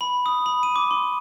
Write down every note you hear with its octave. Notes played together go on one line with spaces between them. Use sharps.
B5
D#6
B5
D#7
D6
C6